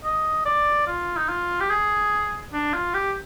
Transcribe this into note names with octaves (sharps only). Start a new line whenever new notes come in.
D#5
D5
F4
D#4
F4
G4
G#4
D4
F4
G4